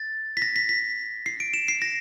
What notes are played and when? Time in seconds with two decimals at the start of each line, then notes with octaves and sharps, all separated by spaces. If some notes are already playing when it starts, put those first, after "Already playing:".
Already playing: A6
0.37 B6
0.42 A#6
0.56 B6
0.69 B6
1.26 C7
1.40 D7
1.54 E7
1.68 C7
1.82 A#6